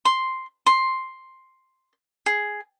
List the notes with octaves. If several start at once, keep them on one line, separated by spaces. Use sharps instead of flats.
C6
C6
G#4